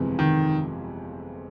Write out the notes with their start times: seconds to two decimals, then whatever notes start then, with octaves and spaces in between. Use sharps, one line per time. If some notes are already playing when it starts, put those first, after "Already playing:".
Already playing: G1 F2 C3 E3 G#3
0.19 D#3